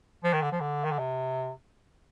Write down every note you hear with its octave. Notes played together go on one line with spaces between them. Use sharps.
F3
D#3
D3
F3
D3
D#3
D3
C3